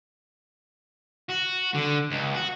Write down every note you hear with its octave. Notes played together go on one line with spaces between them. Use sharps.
F#4
D3
C#2
F#4